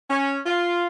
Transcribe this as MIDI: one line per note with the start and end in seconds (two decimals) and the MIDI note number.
0.10 0.39 61
0.46 0.86 65